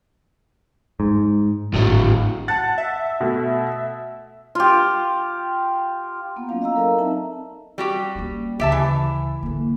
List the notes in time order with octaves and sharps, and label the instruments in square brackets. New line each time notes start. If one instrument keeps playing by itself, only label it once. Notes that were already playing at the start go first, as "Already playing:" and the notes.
[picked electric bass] G#2
[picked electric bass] G#1 [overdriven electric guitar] A2 F#3
[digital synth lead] F#5 [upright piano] A5 A6
[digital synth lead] E5
[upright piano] B2 A3
[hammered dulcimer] F4 G4
[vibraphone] A#3 B3 F#5
F#3 A#3 C#4 E4 F4 F5
D#5 F5 A#5 E6
F#3 A4 A#4 D5 D#5 A#5
C4 D#4 E5 A5
[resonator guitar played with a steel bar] G3 F#4 G4
[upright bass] A#3 C#4
[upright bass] D2 C#3 [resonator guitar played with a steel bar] G4 E5 A5
[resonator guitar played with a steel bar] E3
[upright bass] D3 A#3